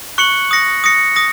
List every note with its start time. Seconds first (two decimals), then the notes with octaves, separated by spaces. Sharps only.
0.18 C#6 F#6 C#7 F#7
0.51 D#6 A#6 C#7
0.84 D#6 A#6 C#7
1.16 D#6 A#6